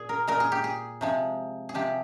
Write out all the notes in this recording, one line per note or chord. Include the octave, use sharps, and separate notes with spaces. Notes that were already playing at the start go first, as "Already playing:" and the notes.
Already playing: A#2 G#4
A#4
A#2 G#3 A#4
G#4
G4
G#4
C3 F3 G#3
G#4
C3 F3 G#3 G4